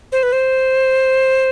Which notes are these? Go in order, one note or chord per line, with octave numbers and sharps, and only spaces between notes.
C5
B4
C5